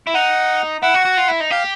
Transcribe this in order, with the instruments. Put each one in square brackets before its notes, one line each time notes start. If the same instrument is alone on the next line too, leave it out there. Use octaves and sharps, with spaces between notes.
[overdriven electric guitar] E4
[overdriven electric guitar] D#4 [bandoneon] F#5
[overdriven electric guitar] E4 [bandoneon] F#5
[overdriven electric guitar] F#4
F#4
F4
E4
D#4
[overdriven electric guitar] G4 [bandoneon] F5